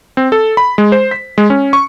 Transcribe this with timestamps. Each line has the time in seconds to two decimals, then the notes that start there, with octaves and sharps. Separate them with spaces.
0.17 C4
0.32 A4
0.57 B5
0.78 G#3
0.92 C5
1.11 B6
1.38 G#3
1.50 C#4
1.73 C#6